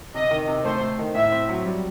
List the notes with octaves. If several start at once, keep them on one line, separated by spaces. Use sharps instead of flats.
C3 D#5
D#3
C3
A3 C5
A3
D#3
A2 E5
C4
F#3
G3